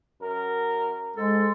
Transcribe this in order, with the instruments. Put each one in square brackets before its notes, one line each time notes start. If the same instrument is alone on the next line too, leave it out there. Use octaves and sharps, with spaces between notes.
[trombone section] F#2 A#4
[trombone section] G#2 [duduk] G#3 [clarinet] A4